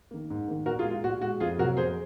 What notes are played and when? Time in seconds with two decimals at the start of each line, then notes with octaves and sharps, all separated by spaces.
0.11 D#3 A#3
0.30 G#2
0.48 D#3 A#3
0.66 A#2 F#4 A#4
0.79 F4 G#4
0.85 G#3
0.91 F4
1.04 A#2 F#4
1.22 G#3 F#4
1.40 F2 F4 G#4
1.58 C3 F#3 A#3 F#4 A#4
1.77 F2 G#4 C5